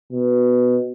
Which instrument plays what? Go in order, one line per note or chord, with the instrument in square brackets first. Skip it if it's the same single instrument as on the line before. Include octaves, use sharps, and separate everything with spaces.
[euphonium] B2